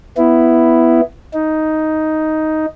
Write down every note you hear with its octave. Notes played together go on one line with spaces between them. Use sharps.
B3 E4
D#4